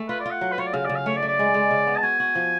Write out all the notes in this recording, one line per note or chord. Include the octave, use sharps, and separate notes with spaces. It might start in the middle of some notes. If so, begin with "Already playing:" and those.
Already playing: A3
F4 B4
D5
F4 F#5
F#3
B4
F4 C#5
D5
C#3 F5
C#3 D5
F5
A3 C#5
D5
A3
D5
G#3
G#3
C#3
B3
A5
F#4 G#5
F#4
F3